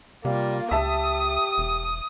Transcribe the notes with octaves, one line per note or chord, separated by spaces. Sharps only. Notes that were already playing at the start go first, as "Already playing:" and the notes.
C3 G3 A#3 F4
C#2 G4 E5 A5 D#6
E1